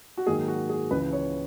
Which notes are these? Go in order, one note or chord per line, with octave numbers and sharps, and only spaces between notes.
F#4
G#2 D#3 F#3 A#3 G#4
F#4
G#4
C#2 C#3 E3 B4
C#5